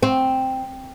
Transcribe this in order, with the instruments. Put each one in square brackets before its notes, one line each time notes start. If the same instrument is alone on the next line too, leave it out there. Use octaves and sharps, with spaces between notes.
[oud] C4